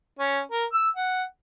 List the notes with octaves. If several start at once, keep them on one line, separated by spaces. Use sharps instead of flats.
C#4
A#4
E6
F#5